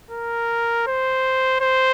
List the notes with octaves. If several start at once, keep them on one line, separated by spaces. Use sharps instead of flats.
A#4
C5
C5